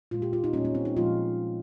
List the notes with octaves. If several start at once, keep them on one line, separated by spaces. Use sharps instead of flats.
A#2 G#3 F4
G4
F4
D#4
A#2 G3 A#3 C#4
C#4
C4
D#4
A#2 F3 G#3 F4